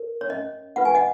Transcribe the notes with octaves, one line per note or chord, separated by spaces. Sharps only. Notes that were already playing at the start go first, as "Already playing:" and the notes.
Already playing: A#4
C#5
C#4 D#5
F4 B4 F#5
G#5
D#5 F#5